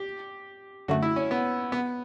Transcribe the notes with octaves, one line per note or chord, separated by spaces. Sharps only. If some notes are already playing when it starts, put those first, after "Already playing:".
Already playing: G4
F#2 D3 A3 F#4
E4
C#4
B3
B3